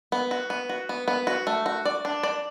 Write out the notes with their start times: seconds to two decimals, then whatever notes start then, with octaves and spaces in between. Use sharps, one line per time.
0.12 B3
0.31 F#4
0.50 B3
0.69 F#4
0.89 B3
1.08 B3
1.27 F#4
1.47 A3
1.66 F#4
1.85 D5
2.05 D4
2.23 D5